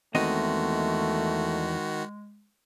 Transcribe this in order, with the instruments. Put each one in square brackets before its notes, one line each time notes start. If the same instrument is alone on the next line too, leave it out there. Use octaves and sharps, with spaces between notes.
[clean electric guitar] E2 C4 D#5 [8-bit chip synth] D#3 F#4 [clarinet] G#3 [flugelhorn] A3